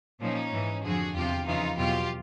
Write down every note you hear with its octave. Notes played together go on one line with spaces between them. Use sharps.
A#2 F3 C#4 D#4
G#2 E3
F2 D3 F3 F#4 G#4
E2 C3 F3 F4 G4
F2 C#3 E3 D#4 F4
E2 B2 F#3 F4 G4